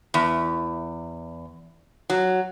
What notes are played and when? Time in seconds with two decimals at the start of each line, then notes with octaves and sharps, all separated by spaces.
0.14 E2
2.10 F#3